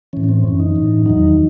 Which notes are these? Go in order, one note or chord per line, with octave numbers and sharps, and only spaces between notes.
A2 E3 C#4
C#4
C4
F#2 E3 C#4
D#4
A2 E3
E2 D#3 F#3 D#4